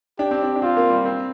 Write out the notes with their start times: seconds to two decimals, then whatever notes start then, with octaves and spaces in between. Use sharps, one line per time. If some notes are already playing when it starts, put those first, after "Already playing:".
0.19 D4 G4
0.31 C4
0.43 D4
0.56 D4
0.62 C4 F4
0.77 A#3
0.90 G3
1.05 C4